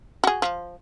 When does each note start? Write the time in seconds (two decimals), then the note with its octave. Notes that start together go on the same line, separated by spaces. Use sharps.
0.24 F#4 G#4
0.42 F3